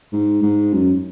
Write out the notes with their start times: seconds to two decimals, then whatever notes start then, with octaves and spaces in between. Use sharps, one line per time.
0.12 G#2
0.42 G#2
0.73 F#2